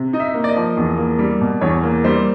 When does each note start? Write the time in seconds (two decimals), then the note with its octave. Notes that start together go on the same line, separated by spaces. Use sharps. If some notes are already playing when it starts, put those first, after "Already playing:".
Already playing: C3
0.13 D#4 D#5
0.20 E5
0.34 A#3
0.44 D5
0.49 D#5
0.56 F3
0.77 E2
0.98 A#3
1.19 G3
1.41 B2
1.61 E2 C#5
1.83 A#3
2.04 G3 C5